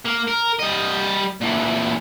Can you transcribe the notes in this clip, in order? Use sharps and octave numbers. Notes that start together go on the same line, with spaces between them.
A#3
A#4
G3 D#5
A#2 E3